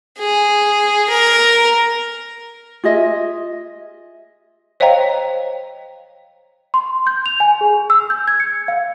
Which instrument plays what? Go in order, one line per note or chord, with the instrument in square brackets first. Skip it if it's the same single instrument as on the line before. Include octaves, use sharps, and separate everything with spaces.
[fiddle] G#4
A#4
[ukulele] F4 G#4 D#5 E5
[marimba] C5 C#5 D#5 F5 G5 A#5
[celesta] C6
G6
F7
G#5
G#4
E6
G6
G#6
C#7
F5